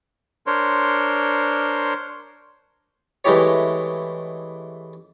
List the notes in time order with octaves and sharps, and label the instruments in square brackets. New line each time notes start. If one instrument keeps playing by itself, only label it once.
[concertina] D4 A#4 C5 C#5 C6
[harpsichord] E3 G#3 A3 E4 G4 C#5